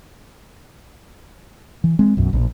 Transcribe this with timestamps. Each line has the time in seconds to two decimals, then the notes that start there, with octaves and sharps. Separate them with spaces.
1.84 E3
1.99 G#3 C4
2.17 B1 F#2
2.33 A#1